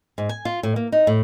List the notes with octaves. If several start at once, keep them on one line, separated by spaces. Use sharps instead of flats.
G#2
G#5
F4
A2
A#3
D#4
A2